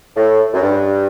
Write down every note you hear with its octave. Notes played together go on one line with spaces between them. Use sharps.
A2
F#2
G2